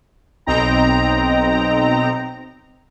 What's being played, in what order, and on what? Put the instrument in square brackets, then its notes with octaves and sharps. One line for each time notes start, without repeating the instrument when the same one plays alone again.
[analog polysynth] B1 C4 D#4 G5 A#5